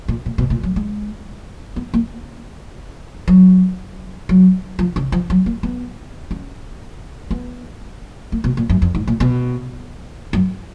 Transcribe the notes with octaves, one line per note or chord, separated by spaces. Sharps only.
A#2
A#2
B2
A#2
F#3
G#3
B3
A#3
F#3
F#3
F3
C#3
F3
F#3
A#3
B3
C#4
B3
A#3
B2
A#2
F#2
F2
G#2
A#2
B2
F#2